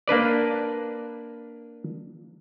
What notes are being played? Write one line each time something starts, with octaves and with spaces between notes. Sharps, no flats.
A#3 D4 B4 D5